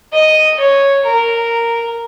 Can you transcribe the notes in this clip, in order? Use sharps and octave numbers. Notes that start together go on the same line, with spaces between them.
D#5
C#5
A#4